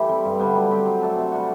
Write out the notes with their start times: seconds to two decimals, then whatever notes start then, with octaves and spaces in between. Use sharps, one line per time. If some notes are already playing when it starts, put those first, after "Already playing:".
Already playing: E3 A3 E4 G4
0.09 G3 C4
0.25 G2
0.40 D3 G3 B3
0.55 F#3
0.71 C4 G4
0.86 F#3
1.01 A3 D4 A4
1.18 C3
1.32 G3 D4 F#4